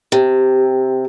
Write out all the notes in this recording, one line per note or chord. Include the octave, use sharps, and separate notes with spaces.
C3